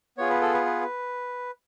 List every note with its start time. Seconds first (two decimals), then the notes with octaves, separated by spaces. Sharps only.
0.18 B3 F4 G#4 C#5
0.30 B4
0.42 A4
0.54 B4
0.65 B4